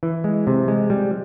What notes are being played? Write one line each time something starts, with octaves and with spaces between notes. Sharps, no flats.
E3
G#3
C3
G#3
G3